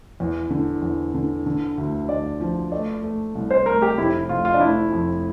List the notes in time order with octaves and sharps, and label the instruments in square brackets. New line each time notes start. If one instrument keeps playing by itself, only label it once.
[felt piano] E2
D3
E2
D3
D3
D2
[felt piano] D2 [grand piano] D5
[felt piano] F3
[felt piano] A3 [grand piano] D5
[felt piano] A3
C2
[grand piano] C5
[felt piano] A3 [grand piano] A#4
[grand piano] G4
[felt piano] F1 [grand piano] E4
[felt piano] F1 [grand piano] F4
[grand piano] F4
D4
[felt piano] A3 [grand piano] E4
[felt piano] F2